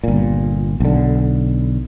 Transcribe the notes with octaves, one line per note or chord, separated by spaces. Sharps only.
G1 A#2
B1 D3